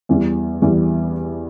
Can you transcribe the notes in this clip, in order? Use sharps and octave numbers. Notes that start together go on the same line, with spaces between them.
E2 E3 G3
E2 E3 G3